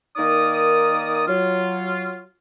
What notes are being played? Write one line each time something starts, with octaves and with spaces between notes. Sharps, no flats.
D#3 A#3 D#4 A#4 D5 D#6
F#3 F4